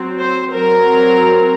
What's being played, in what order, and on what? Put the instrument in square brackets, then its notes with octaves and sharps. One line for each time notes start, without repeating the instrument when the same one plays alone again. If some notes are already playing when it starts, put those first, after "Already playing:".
Already playing: [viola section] F#3 C4
C5
F#3 C4 A#4